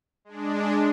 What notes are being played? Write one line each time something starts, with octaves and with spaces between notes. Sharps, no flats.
G#3 D4